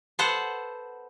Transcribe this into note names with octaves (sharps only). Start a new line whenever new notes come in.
B3 A4 C5 F#5